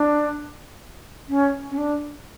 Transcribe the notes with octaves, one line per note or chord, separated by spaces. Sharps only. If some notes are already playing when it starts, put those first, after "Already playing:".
Already playing: D4
C#4
C#4
D4